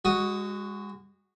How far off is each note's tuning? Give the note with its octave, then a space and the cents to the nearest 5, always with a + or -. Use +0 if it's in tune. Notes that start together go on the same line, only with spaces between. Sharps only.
G#3 -35 F#4 +0 D#6 +10